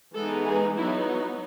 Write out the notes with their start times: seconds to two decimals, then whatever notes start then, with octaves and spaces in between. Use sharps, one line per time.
0.14 E3 G#3 B3 D#4 A4
0.45 G#4
0.76 F#3 B3 D#4 E4